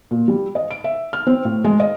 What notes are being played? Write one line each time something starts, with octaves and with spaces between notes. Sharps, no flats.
A#2
G3
D#5
D7
E5
F6
C4
A2
G#3
D#5